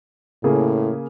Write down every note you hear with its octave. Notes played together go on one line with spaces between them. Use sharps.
A2 C#3 A#3 G#4